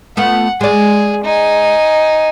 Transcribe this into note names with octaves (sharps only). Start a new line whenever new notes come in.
A3 B3 F4 F#5
G#3 G#4 D5
D#4 G#5